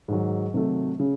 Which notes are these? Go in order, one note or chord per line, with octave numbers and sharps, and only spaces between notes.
G#2 D#3 F#3
C3 D#3 F#3 A3
C#3